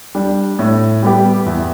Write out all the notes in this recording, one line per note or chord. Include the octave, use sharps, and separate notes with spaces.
G3 D4
A2
G3 B3 G4
E2